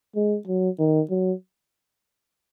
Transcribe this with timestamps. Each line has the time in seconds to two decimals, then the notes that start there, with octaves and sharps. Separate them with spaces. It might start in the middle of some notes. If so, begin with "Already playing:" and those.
0.16 G#3
0.47 F#3
0.79 D#3
1.10 F#3